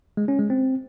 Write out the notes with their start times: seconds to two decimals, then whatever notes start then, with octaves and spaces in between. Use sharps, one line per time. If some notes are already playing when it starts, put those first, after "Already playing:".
0.17 G#3
0.28 C#4
0.39 G#3
0.50 C4